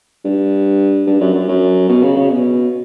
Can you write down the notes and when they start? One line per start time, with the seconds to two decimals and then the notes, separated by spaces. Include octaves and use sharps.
0.25 G2
1.07 G2
1.21 F#2
1.34 F#2
1.48 F#2
1.89 B2
2.03 C#3
2.17 C#3
2.30 B2